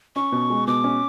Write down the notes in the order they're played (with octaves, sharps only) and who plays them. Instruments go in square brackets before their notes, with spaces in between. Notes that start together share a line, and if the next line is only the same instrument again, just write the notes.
[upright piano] C#4 [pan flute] C#6
[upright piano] B2
G#3
[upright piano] B2 [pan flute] D6
[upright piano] C#4